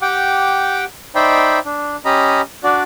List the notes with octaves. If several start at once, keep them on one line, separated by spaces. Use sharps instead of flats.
G4 F#5 G5 D6
D#4 C5 D5 E5 G5 B5
D4
C#4 G4 D#5 A#5 B5
D4 F#4 D5